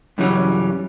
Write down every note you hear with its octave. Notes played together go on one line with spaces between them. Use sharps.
G2 C#3 E3 F#3 G3 C#4